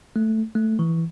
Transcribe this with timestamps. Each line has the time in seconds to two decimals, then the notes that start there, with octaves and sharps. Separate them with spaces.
0.16 A3
0.55 A3
0.79 E3